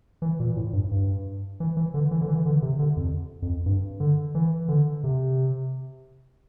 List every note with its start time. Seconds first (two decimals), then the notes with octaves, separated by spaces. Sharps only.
0.22 E3
0.40 A#2
0.57 A2
0.73 G2
0.91 G2
1.60 E3
1.77 E3
1.94 D3
2.11 E3
2.21 D3
2.29 E3
2.45 D3
2.62 C3
2.79 D3
2.97 F2
3.42 F2
3.66 G2
4.00 D3
4.35 E3
4.68 D3
5.04 C3